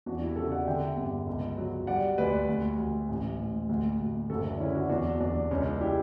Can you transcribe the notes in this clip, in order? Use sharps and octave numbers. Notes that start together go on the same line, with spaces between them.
E2 D4 F#4
E4 G4
C#3 F#4 A4
D5 F#5
D3 E5 G5
G1
C#2
F#3
G3 D5 F#5
D2 B4 D5
D2
D2
A1
A2
D2
D2
F#1 F#4 A4
D4
D3 C#4 E4
D4 F#4
E2 D4 F#4
E2 D4
C#2 C#4
D4
E4 G4